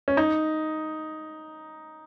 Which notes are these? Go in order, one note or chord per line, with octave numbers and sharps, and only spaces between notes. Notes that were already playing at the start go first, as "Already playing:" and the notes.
C#4
D#4